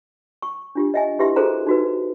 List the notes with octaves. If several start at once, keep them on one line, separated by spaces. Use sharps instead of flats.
C#6
D4 F4 G4
D#5 E5 G#5
E4 G4 B4 E5 C6
F#4 G#4 A4 C5 A#5
D#4 F#4 B4